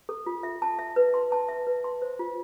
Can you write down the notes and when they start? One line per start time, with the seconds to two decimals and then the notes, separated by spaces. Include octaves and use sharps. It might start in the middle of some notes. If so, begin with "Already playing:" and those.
0.09 A4
0.26 F4
0.43 E5
0.62 A5
0.79 E5
0.96 B4
1.14 C6
1.32 A5
1.49 E5
1.67 B4
1.84 C6
2.02 C5
2.19 F4